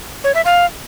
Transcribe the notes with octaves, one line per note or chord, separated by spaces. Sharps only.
C#5
E5
F5